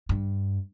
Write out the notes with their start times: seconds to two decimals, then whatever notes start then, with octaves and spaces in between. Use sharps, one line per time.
0.09 G2